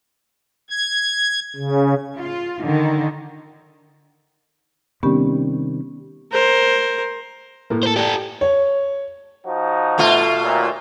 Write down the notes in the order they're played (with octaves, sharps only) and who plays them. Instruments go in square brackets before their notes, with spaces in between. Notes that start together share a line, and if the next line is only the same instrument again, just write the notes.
[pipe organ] G#6
C#3
[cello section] F4
D3 D#3
[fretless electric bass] C3 D#3 G3 [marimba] B3 C#4 G4
[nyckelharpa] A#4 C5
[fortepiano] A2 A3 A#3
[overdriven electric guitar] A4 C5
[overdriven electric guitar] G4 A4 [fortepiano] D5 G5
[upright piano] C#5
[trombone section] F3 D#4 F#4
[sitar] B2 A3 F4
[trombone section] D#2 A#2